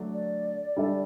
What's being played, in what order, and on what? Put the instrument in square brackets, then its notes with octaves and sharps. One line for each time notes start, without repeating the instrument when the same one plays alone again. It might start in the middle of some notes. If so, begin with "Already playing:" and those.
Already playing: [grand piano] D3 F#3 A3 D4
[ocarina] D5
[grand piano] D3 G3 D4 A4 E5